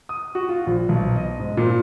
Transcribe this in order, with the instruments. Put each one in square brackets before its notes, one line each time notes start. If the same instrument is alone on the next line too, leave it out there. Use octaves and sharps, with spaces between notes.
[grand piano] D#6
F#4
F4
A#1
B1
D#5
G#2
A#2